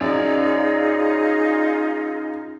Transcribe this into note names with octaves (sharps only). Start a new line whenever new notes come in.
F#2 D#4 F4 G#4 C#5 D5